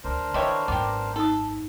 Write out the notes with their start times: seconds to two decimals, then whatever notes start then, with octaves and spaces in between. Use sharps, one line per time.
0.04 D2 D3 D4 A#4 C5
0.34 D#3 E4 G4 B4 C#5 D#5 C6
0.68 G#1 F#2 B3 G4 D6
1.16 D#4 A4 D#6